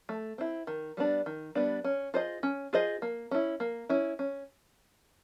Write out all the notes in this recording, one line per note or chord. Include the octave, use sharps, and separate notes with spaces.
A3
C4 E4
D#3
G3 B3 D4
D#3
G3 B3 D4
C#4
F4 G#4 C5 D#5
C#4
F4 G#4 C5 D#5
A#3
C#4 E4
A#3
C#4 E4
C#4